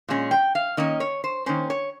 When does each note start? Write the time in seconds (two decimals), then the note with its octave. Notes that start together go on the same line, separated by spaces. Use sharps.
0.08 A#2 G#3 C#4
0.31 G5
0.55 F5
0.77 D#3 A#3 C#4 D#5
1.00 C#5
1.24 C5
1.46 D#3 A#3 C#4 C5
1.70 C#5